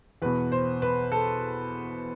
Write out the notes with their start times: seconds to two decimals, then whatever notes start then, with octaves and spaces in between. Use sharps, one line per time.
0.22 E2 B2 B4
0.52 C5
0.82 B4
1.12 A4